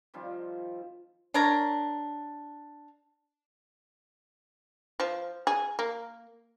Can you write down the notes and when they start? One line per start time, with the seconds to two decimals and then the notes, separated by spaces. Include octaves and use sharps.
0.14 D#3 F3 G3 C4
1.34 D4 A#4 C#5 A#5
5.00 F3
5.47 G#4
5.79 A#3